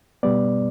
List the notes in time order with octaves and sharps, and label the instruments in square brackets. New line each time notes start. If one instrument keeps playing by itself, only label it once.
[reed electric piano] B2 G3 B3 D5